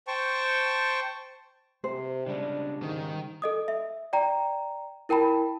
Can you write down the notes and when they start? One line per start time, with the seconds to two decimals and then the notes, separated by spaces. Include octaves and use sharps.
0.07 C5 G5 A5 C#6
1.84 C3 C5
2.26 C#3 G3 G#3 D4
2.83 G#2 D#3
3.42 A4 D#5 D#6
3.68 E5
4.13 D5 G5 A#5
5.09 E4 A#4 G5 A5 B5